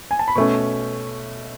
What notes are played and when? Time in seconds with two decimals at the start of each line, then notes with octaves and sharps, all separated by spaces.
0.11 G#5
0.19 A5
0.28 B5
0.36 B2 A3 C#4 C#6